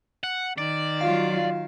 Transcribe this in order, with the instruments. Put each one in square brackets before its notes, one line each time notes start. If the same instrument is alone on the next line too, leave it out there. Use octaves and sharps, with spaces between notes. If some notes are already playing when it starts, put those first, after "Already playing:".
[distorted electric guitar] F#5
[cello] D#3 [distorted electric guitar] D5
[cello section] F#3 F4 [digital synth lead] F5